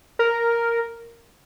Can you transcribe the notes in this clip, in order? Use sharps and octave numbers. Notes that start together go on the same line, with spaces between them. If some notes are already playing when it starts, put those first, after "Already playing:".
A#4